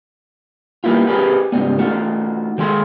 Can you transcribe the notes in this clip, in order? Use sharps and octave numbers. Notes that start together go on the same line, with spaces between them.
G3 A#3 B3 E4 F4
C4 G4 G#4 A#4 B4
C#2 G#2 G3 B3
A3 D#4 F4 F#4
D#3 G#3 A4 C6